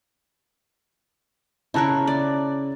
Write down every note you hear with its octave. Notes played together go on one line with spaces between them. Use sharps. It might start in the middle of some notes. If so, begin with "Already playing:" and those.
C#3 E4 A#4 A5 C#6 F#6
D5